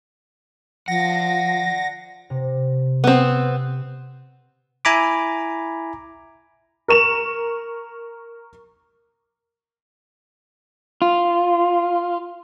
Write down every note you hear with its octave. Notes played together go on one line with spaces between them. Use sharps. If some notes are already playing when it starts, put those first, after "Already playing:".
F3 D5 F#5 A#6
C3
B3 C4
E4 G#5 A#5 B5 D6
A#4 C#6 E7 F7
F4